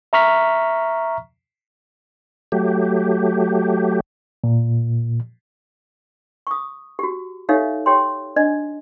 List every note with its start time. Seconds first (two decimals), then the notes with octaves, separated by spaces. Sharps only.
0.13 E5 A#5 C#6 F6 B6
2.52 F#3 A3 G4
4.44 A#2
6.47 C#6 D#6
6.99 F#4 G4
7.49 D#4 G4 A4 C#5 E5 F5
7.86 G4 C#5 G5 C6
8.36 D4 D5 D#5